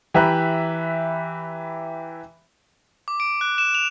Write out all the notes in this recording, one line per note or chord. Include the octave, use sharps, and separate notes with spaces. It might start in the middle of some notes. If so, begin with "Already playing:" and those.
E3 G4 B4 E5 A#5 F#6
D6
D7
F#6
E7
F7